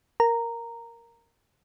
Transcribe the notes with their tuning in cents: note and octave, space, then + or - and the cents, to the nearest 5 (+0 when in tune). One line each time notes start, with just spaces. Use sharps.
A#4 +0 A#5 -10